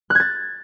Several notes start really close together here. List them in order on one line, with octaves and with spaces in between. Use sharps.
F#6 G#6 A6